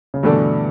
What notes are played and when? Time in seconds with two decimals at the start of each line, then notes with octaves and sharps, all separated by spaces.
0.14 C#3
0.23 G2 B2 D3 E3 A3 D4 A4